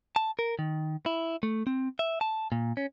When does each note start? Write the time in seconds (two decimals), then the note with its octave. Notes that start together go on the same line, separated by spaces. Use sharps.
0.16 A5
0.39 A#4
0.59 D#3
1.06 E4
1.43 A3
1.67 C4
1.99 E5
2.21 A5
2.52 A#2
2.77 C#4